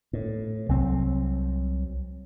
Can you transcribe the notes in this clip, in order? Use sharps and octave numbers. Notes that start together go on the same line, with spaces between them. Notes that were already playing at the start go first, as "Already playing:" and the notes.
A2
C2 F#3 C4